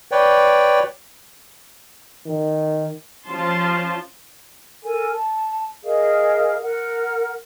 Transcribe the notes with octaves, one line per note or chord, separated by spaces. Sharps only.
B4 C#5 D5 G5
D#3
F3 C#4 F4 A5 C6
A4 A#4 G#5
A5
G#4 A#4 D#5 F5
A#4 F#5